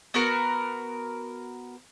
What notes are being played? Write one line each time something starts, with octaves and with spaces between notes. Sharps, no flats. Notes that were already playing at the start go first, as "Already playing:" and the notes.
B3 F#4 A#4